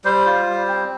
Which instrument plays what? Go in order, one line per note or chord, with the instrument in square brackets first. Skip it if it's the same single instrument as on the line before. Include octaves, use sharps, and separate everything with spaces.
[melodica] G3 C5
F4
G3
C4